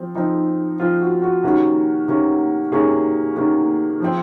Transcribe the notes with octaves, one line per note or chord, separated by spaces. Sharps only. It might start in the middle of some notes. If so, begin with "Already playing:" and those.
Already playing: F3 C4
F3 C4 D#4
F3 C4 F4
F#4
F#4
C3 D#3 A#3 C#4 F#4
C3 D#3 A#3 C#4
C3 D#3 A#3 C#4 G#4
C3 D#3 A#3 C#4
F3 C4